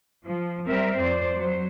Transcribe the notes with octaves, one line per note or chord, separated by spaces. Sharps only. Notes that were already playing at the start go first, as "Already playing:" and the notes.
F3
G3 C4 A#4 E5
F2 C5 D5
F#3 C5